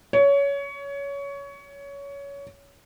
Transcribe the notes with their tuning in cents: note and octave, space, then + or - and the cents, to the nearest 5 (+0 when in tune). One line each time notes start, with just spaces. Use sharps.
C#5 +20